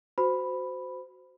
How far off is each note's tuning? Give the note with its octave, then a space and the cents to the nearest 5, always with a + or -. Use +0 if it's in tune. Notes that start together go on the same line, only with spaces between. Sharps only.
F#4 +0 C5 -25 B5 +0